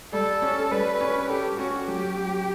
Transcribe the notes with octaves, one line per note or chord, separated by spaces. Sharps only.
G3 A4
C#4
G3 B4
C#4
G4 A4
C#4 F#4
F#3 G4
F#3